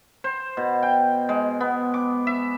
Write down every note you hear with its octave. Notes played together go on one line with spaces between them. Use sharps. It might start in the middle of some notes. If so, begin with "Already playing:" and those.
C5
B2
G5
G#3
B3
D6
E5